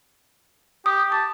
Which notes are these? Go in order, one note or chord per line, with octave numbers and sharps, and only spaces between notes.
G4 D#6
A5 D6